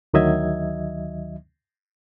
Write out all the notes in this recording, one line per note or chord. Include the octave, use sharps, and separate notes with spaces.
D2 D#3 F#3 D#5 E5 G#6